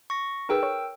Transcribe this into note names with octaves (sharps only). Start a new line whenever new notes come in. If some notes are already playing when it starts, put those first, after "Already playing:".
C#6 A#6
D#4 G#4 A#4 B4 G5 E6
C#5 C#6